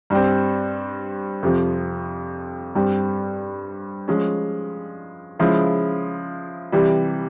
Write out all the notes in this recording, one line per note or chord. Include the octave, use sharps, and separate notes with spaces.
G2 G3 C4
F2 C3 F3
G2 G3 C4
F3 G#3 C#4
C#3 F3 G#3 E4
C3 E3 G3